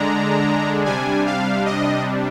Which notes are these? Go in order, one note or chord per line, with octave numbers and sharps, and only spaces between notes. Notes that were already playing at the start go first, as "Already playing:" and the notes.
Already playing: D3 G#3 D4 A#5
C3 G3 D4 G#5
F5
D#5